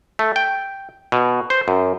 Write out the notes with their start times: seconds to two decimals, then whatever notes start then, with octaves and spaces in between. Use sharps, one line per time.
0.19 A3
0.36 G5
1.12 B2
1.50 C5
1.68 F#2